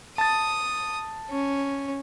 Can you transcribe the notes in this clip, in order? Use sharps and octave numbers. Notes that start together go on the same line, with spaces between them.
A5 D#6 A6
C#4